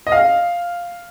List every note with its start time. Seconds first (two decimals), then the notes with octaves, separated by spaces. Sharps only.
0.07 D#5
0.12 F5